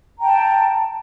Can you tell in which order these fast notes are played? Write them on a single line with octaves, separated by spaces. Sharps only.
A#5 G5 A5